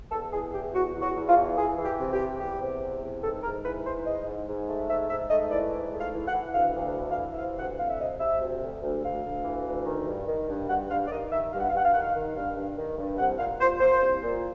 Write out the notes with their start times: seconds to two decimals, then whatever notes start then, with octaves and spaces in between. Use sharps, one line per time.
0.11 E2 A4
0.32 E3 G#4
0.53 E2 G4
0.75 E2 F#4
0.95 E2
1.02 F#4
1.15 E2
1.29 F4
1.36 E3
1.57 E3 G#4
1.78 E3
1.84 G4
1.99 C3
2.13 G4
2.19 E3
2.40 E2 G4
2.61 C3
2.81 E2
3.02 C3
3.23 G#2 A4
3.43 G#2 A#4
3.64 E3 B4
3.86 G#2 C5
4.06 G#2 D#5
4.27 G#2
4.48 G#2
4.69 A3
4.89 G#2 E5
5.10 G#2 E5
5.30 A3 D#5
5.51 E3 D5
5.72 G#2
5.93 A3
6.00 F5
6.14 E3
6.27 F#5
6.34 E3
6.54 D2 F5
6.75 D2
6.96 E3
7.11 F5
7.18 E3
7.33 E5
7.37 C3 F5
7.58 D2 F#5
7.79 C3 F5
7.90 E5
7.99 C3 D#5
8.20 C3 E5
8.41 D2
8.63 D2
8.82 D2
9.04 D2 F5
9.24 D2
9.45 E3
9.66 D2
9.86 D#3
10.07 G2
10.27 D#3
10.49 G2
10.69 G2 F#5
10.90 G2 F5
11.07 D5
11.10 D#3 D#5
11.32 D#3 E5
11.53 G2 F5
11.60 F#5
11.69 F5
11.73 G2 F#5
11.84 F5
11.92 D#3 F#5
12.01 F5
12.15 D#3
12.35 G2 F5
12.56 G2
12.77 D#3
12.98 G2
13.18 C2 F#5
13.38 A#2 F5
13.59 A#2 C5
13.80 A#3 C5
14.01 C2
14.23 A#2